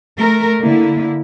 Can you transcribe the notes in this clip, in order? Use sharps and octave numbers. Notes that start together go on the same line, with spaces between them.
A3 A#4
D3 A#3 E4